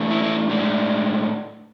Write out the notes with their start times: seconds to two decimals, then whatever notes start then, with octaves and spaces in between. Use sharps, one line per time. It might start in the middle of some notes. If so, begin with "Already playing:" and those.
Already playing: E3 A3 D4
0.11 E4
0.23 E4
0.50 A2 G#3 D4